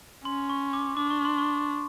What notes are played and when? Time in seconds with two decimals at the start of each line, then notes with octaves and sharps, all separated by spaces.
0.25 C#4 C6
0.50 C#6
0.73 D6
0.97 D4 D6
1.10 C#6
1.25 C6
1.38 C#6